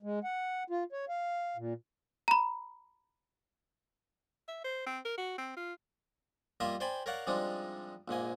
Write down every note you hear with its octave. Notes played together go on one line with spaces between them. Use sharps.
G#3
F#5
F4
C#5
F5
A#2
A#5 B5
E5
C5
C4
A#4
F#4
C4
F4
G3 A#3 F4 D#5 E5
C5 D5 G5 G#5 B5
A#4 C#5 D5 F5 F#5
C3 F3 G3 G#3 D4 D#4
A#1 G#2 A#3 G#5